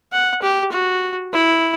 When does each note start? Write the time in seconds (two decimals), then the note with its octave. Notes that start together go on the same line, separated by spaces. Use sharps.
0.12 F#5
0.42 G4
0.72 F#4
1.33 E4